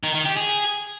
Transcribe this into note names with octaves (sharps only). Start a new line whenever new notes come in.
D#3
D#3
G4
G#4